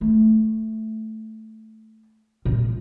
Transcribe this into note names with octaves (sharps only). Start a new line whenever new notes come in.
A3
A#2